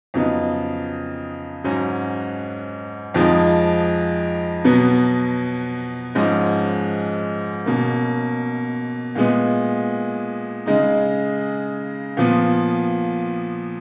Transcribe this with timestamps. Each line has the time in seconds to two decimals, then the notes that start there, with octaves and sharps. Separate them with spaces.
0.14 F2 C#3 F#3 B3 D#4
1.64 G#2 F#3 C#4
3.14 F2 F3 G#3 D#4
4.65 B2 F#3 B3
6.15 G#2 F3 G#3 C#4
7.66 B2 A#3 C#4
9.15 A#2 G#3 B3
10.66 C#3 G#3 D#4
12.17 A#2 F3 B3